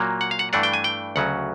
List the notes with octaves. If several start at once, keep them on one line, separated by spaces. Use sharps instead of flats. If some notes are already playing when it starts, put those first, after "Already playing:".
Already playing: A#2 F#3 A#3
F#5
F5
F#5
G2 E3 A3 D4 F#5
G5
G#5
G5
D2 C#3 F#3 F#5